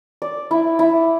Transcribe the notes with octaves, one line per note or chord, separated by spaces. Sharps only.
D5
E4
E4